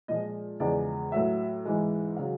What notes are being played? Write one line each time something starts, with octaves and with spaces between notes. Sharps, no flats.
A#2 F3 G#3 D#5
E2 C#3 F3 G#3 D5
A2 F#3 E5
G#2 E3 G#3
C#3 F#3 F5